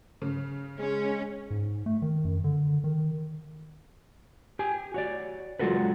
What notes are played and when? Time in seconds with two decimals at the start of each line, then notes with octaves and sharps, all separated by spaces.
0.22 C#3
0.79 G#3 C#4
1.51 G#2
1.86 A3
2.02 D#3
2.25 F#2
2.44 D3
2.84 D#3
4.59 G4 G#5
4.94 F#4 C#5 D5
5.59 F#3 G#3 F4 F#4 A4 B4